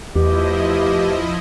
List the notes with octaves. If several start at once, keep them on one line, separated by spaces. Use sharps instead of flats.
E2 B2 F3 A3 E4 G4 D#5